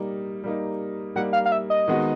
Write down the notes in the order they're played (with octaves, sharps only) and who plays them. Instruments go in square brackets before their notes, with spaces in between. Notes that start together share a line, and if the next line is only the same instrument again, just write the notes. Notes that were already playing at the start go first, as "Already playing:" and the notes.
Already playing: [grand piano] G3 A#3 D#4
G3 A#3 D#4
[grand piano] G3 A#3 D#4 [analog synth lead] F#5
[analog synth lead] F5
F5
E5
D#5
[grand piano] D#3 G#3 B3 D#4 F#4